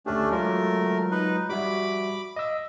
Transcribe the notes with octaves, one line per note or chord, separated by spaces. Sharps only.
D2 A3 C#4 D4 G4
F#3 G#3 A3 F4 A#4
D#4 B4
G3 F#4 E5 B5 D6
D#5 E6